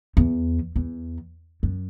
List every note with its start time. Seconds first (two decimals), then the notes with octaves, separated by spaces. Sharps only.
0.17 E2
0.76 E2
1.63 F#2